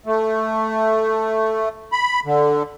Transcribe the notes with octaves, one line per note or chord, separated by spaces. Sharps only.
A3
B5
D3